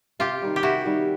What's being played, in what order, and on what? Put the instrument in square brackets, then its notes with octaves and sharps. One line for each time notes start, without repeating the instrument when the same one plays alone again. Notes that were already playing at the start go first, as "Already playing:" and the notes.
[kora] C3 [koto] F4 G4
[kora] D#3 G3
[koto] G4
[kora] C3 [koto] E4 F#4
[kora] D#3 G3